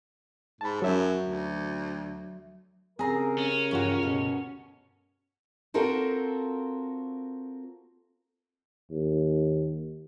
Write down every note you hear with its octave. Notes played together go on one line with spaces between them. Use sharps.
G#2 A5 B5
F#2 F#3 E5
D2
C#3 G3 C4 G#4 A#4 A#5
C#4
G2 E3 F4 F#4 C#5
D2 G2 B2
C4 F4 F#4 A4 A#4 C5
D#2